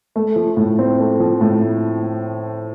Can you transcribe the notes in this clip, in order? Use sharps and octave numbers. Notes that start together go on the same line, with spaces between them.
A3
F3
A2
C4
A3
F3
A2